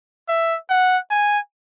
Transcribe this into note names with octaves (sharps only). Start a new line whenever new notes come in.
E5
F#5
G#5